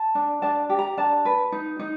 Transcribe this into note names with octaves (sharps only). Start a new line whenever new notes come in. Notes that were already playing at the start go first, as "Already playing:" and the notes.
Already playing: A5
D4
D4 A5
G4
A#5
D4 A5
B4
D#4
D#4